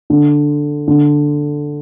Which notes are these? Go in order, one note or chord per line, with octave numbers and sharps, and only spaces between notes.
D3
D3